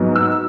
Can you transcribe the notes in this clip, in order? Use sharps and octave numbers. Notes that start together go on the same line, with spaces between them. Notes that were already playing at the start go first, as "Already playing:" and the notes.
Already playing: G#2 F#3 B3
E6